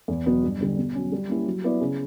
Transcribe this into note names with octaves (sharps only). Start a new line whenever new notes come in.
E2
B2 F#3 B3
G2
D3 G3
B2
F#3 C#4
G3
A#3 C#4 E4 G4
F#3
B3 E4 B4 D5
C#3